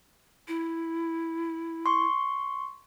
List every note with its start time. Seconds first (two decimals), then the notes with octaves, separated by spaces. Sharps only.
0.48 E4
1.86 C6 C#6